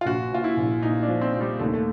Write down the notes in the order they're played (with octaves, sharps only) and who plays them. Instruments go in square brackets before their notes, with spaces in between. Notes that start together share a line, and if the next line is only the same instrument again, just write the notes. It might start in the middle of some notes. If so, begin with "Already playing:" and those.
[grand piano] F4
[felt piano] A#1 [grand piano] F#4
[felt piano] A#2 [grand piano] F4
[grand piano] E4
[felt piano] A#1
[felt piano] A#2 [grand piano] D#4
[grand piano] D4
[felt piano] F3
[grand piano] C4
[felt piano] A#2
[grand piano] G3
[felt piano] D#2 [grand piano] A3
[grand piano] A3